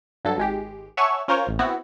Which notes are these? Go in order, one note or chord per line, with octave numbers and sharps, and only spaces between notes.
G2 F#3 A4
G#1 G#3 G4
C#5 E5 F#5 G#5 A5 C#6
C#4 F4 A#4 C5 C#5
A1
B3 C4 E4 F#4